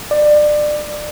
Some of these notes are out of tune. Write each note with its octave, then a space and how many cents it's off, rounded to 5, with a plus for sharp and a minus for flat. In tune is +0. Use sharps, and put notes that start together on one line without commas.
D5 +25